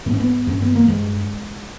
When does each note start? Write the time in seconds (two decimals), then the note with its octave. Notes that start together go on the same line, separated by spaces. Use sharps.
0.06 G#2 B3
0.13 C#4
0.20 B3
0.47 G2 C#4
0.62 B3
0.75 A#3
0.88 G2 G#3